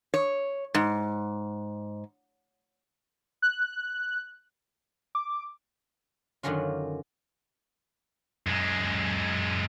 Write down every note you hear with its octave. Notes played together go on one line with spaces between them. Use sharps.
C#5
G#2
F#6
D6
F#2 D3 D#3 F#3 C#4 F4
F#2 G#3